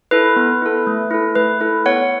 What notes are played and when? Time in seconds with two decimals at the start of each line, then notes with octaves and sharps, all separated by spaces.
0.11 E4 A4 B4
0.36 B3
0.62 E4 A4
0.87 A3
1.11 E4 A4
1.35 A3 B4
1.60 E4 A4
1.86 B3 C#5 F#5